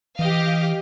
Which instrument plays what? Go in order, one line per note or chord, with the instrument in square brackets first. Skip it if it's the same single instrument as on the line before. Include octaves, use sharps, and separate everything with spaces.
[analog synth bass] E3 [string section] G4 D#5 F5